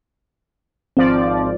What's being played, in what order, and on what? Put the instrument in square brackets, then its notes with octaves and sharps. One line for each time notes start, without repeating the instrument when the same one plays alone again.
[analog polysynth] G#1 F3 D5 [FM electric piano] C4